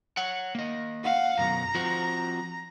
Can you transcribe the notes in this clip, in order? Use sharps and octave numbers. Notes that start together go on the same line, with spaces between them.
C#5 F#5
A#3 D#5
F5 F#5
F#2 B2 F#3 A#5
F3 C4 F#4